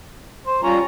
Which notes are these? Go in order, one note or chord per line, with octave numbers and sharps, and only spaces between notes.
C5
G3 C#4 F4 A#5